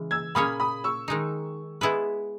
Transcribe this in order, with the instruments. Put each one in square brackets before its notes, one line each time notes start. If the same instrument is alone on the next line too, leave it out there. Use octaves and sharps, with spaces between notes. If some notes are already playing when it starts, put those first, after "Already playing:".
Already playing: [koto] C#3 E3 G#3
[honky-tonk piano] E6 G#6
[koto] A#2 A#3 C#4 G#4 C#5 [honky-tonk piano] B5 D#6
[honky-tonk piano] B5 D#6
C#6 E6
[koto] D#3 G#3 D#4
G#3 B3 E4 G#4 B4